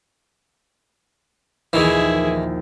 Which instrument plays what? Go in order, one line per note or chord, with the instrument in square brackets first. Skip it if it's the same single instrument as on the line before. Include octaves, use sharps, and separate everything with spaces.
[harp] A#1 D#2 [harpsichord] D#3 E3 [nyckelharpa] E4 G#4